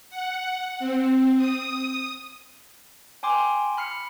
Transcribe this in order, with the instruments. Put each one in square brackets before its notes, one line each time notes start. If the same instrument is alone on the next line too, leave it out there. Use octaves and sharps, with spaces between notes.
[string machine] F#5
C4
D#6
[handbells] G5 G#5 C6 D6
B5 F6 C7 C#7